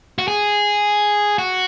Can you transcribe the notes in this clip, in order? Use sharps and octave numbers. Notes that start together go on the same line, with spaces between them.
F#4
G#4
F#4